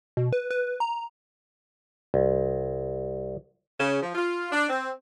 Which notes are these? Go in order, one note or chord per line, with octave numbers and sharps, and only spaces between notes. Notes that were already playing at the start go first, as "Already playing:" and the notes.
B2
B4
B4
A#5
C2
C#3
F3
F4
D4
C4